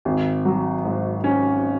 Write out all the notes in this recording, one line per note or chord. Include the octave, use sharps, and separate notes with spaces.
G#1
F#3
G#2
C#4